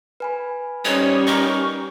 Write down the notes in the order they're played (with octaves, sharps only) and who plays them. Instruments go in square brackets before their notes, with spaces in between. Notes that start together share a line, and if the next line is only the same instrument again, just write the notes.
[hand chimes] B4 G#5 B5
[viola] G3 C#4 [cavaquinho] D#4 C5 D#6 [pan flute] C#5
[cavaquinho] D#4 A#4 [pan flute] C#6